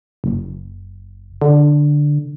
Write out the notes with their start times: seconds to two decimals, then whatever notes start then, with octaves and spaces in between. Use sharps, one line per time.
0.24 F#1
1.42 D3